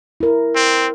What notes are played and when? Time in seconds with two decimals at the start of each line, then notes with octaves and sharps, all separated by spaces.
0.20 E4 A#4
0.55 C4